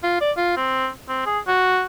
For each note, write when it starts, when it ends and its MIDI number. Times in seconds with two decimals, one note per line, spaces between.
0.03 0.20 65
0.21 0.32 74
0.37 0.55 65
0.57 0.88 60
1.09 1.22 60
1.26 1.39 68
1.48 1.85 66